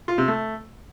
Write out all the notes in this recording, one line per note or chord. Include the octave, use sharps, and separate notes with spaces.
F4
C3
A3